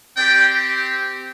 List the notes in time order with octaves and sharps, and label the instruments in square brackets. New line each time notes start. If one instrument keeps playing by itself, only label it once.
[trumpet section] C4 G4 D5 G5